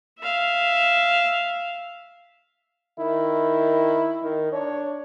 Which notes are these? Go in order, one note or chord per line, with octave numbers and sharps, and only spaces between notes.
E5 F5
D#3 E4
D#3
D4 C#5